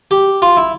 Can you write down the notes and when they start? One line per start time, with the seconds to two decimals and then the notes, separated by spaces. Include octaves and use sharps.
0.11 G4
0.42 F4
0.57 E4